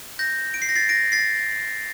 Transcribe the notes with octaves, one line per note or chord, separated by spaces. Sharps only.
G6 A#6
D7
C7
A#6
A6 C7
A#6 D7
A6 C7